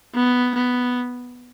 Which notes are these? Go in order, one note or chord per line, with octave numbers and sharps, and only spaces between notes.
B3
B3